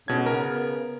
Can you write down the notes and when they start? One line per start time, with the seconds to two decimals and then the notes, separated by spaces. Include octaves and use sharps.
0.08 G#2 B2 D3 C#4 G#6
0.26 C#3 B3 A#4